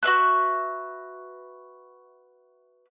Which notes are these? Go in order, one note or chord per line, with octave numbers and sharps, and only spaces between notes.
F#4 B4 E5 F#6